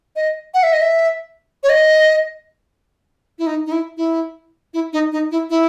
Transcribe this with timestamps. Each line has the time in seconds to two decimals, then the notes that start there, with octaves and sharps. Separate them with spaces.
0.16 D#5
0.54 F#5
0.63 E5
0.73 D#5
0.82 E5
1.63 C#5
1.69 D#5
3.39 E4
3.47 D#4
3.66 D#4
3.72 E4
3.97 E4
4.74 E4
4.93 D#4
5.12 D#4
5.31 E4
5.50 E4